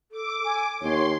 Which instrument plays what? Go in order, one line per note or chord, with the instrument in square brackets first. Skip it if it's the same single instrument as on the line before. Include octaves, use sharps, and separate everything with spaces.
[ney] A4 [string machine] D6
[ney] G#5
[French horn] D#2 [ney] C#5 [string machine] C6